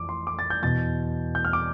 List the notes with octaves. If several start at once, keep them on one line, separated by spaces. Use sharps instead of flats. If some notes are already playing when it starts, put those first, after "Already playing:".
Already playing: F2 E3 D6
C6
D6
A6
G6
E2 B2 A6
G6
F6
D6